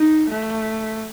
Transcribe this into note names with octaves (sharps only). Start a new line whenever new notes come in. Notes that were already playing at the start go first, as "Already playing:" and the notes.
Already playing: D#4
A3